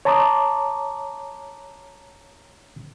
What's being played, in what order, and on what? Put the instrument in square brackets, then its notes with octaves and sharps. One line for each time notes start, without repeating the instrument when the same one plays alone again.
[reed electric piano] C#5 A5 A#5 C6 D6 D#6